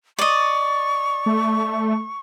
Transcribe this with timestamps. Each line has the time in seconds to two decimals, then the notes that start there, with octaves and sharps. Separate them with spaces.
0.19 D5 D#5 C#6
1.26 A3